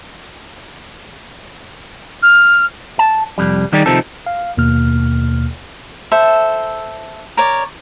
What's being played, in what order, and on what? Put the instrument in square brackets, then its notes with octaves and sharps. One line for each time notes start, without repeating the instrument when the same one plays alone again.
[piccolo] F6
[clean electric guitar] A5
C2 F2 G3
D#3 G3 D#4 G4 G#4 D5
C3 D#3 F3 C4 D#4 A4
[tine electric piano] F5
D#2 B2 A#3 F6
[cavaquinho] A4 C5 E5
A#4 C#5 D5